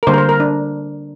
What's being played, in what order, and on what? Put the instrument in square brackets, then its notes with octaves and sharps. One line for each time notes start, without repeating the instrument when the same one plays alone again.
[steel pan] A#4
D3 G3 A#3 C5
A#4
C5
A#4
D4